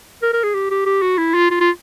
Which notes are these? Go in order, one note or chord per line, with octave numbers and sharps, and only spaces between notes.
A#4
A#4
G#4
G4
G4
G4
F#4
E4
F4
F4
F4